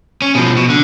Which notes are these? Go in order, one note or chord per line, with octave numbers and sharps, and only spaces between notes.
C#4
B2 F3
B2
D3